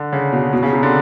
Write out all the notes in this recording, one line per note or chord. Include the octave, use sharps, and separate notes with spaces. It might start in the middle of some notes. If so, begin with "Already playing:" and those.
Already playing: D3
C#3
B2
B2
C#3
C3
D3